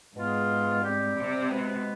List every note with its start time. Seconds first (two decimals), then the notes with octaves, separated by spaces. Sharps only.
0.15 G#2 B2 B3 F4 G#4
0.82 G3 C4 G4
1.16 C3
1.50 B2 G#3 B3